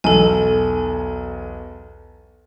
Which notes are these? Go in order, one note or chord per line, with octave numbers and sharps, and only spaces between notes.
B1 E2 A4 G#5